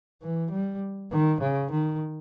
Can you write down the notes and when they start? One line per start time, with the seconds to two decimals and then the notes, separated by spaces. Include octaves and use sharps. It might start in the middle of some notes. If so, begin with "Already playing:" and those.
0.22 E3
0.51 G3
1.12 D#3
1.41 C#3
1.71 D#3